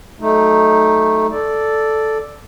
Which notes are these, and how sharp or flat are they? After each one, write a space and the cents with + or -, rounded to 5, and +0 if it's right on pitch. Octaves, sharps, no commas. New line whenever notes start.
F#3 +5 A3 -5 D#4 +0
A4 +0 D5 +0